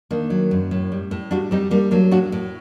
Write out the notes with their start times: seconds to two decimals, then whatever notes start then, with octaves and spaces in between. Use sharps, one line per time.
0.11 D#3 A#3 D4
0.30 F#3
0.51 F#2
0.71 A2
0.92 G3
1.11 A2
1.31 G3 D4 F#4
1.51 G3 C4 D#4
1.71 G3 A#3 D4
1.91 F#3 A#3 D4
2.11 A2 D4 F#4
2.32 A2